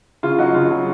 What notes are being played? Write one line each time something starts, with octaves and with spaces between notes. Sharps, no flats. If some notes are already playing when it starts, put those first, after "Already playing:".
C#3 F4
F#3 D#4 F#4
C#3 F4
F#3